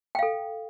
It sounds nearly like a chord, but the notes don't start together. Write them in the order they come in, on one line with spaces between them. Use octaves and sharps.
G5 F5 A4